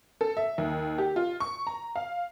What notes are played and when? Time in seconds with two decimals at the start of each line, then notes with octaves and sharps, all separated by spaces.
0.21 A4
0.37 E5
0.58 D#2
0.98 G4
1.16 F4
1.40 C#6
1.67 A#5
1.96 F5